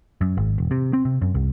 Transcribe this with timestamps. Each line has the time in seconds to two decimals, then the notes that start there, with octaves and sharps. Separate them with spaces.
0.21 F#2
0.37 G#1
0.58 E1
0.71 C3
0.93 C4
1.05 C3
1.22 F#2
1.34 C2